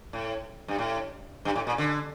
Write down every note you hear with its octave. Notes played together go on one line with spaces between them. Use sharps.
A2
G2
A2
G2
A2
A#2
D3